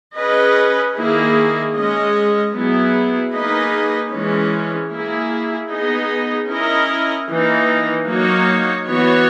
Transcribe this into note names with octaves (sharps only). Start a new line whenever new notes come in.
C#4 G#4 B4 D#5
D#3 A#3 E4 G#4
G#3 C#4 G#4 D#5
F#3 B3 E4 G#4
A#3 D#4 G#4 B4 D#5
E3 G#3 C#4
A#3 E4 G#4
B3 D#4 G#4 D#5
C#4 E4 A#4 D#5
E3 A#3 D#4
F#3 A#3 D#4 F#4 C#5
E3 B3 F#4 C#5